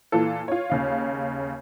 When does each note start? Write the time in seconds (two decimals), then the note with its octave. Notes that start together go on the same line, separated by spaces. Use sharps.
0.12 A#2 E3 F4 A4
0.48 F4 C#5
0.70 D#2 C#3 F5